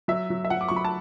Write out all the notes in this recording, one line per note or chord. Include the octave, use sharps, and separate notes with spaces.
F#3 E5
F#3
E5
F#3 F#5
D6
F#3 C#6
B5
A5